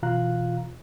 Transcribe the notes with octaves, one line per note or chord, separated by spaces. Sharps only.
B2 E3 F4 F5 A#5 F#6